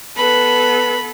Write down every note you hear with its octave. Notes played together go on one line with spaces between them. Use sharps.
B3 A4 B4 B5